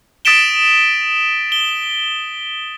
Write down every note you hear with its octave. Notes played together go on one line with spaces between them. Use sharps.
D#6 A6 B6 D7 E7 G7
G7